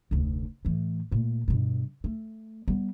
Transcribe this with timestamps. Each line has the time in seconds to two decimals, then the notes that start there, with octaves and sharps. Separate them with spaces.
0.11 F1 D2
0.65 A2 E3
1.12 A#2 A3
1.48 G2 B2
2.04 A3
2.68 G3 B3